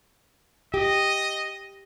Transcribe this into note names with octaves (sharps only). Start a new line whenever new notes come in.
G4 D#5